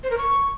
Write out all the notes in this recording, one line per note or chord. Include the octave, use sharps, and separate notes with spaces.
C5
A#4
C#6